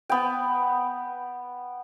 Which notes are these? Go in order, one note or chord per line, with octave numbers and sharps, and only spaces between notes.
B3 G5